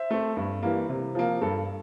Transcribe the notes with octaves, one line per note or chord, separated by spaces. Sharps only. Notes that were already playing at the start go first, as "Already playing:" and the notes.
Already playing: C5 E5
A3 C4
G2
E3 G3 A#3
C3
F3 A#3
G2 A4